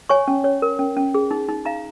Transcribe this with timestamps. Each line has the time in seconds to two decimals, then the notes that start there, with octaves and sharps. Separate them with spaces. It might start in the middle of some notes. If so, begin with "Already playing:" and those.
0.09 C#5 G#5 C#6
0.28 C#4
0.44 C#5
0.62 A#4
0.79 C#4
0.97 C#4
1.14 G#4
1.31 D#4
1.49 D#4
1.65 D#4 F5 A#5